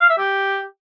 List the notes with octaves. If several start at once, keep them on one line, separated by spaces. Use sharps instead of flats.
F5
E5
G4